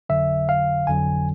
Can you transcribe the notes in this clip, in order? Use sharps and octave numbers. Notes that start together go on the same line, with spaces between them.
G1 F2 D3 F#3 E5
F5
G1 F2 D3 F#3 G#5